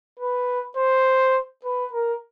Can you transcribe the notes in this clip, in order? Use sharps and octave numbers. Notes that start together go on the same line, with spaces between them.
B4
C5
B4
A#4